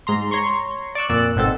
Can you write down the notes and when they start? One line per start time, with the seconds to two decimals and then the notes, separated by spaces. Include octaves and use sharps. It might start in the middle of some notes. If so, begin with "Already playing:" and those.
0.07 G#2 A#5 C6
0.31 C#5 A#5 C6 C#6
0.95 D5 C#6 E6 F#6
1.09 F2 A#2 D5 E6 F#6
1.36 G#1 B2 C4 A4 E6